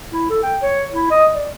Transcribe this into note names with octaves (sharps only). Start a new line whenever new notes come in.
E4
A4
G5
C#5
E4
D#5
D5